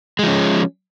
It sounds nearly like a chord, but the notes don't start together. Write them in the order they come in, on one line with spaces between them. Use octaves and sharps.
G#3 F3 C#4